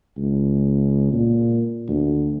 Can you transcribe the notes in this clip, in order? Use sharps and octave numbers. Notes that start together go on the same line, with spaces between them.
C#2
A#2
D2